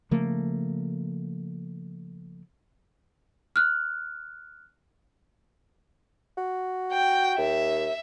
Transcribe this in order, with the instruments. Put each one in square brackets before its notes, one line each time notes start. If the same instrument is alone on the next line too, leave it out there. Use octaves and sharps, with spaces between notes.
[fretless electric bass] C#3 F3 A3 A#3
[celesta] F6 F#6
[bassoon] F#4
[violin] G5
[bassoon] D#2 [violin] E5